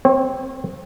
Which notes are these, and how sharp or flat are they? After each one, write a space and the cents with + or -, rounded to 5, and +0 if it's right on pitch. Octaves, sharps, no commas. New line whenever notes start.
C4 +0 C#5 -40